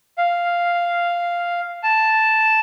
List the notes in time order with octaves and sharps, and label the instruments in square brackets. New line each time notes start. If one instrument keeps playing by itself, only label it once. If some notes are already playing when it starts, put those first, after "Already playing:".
[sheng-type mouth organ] F5
A5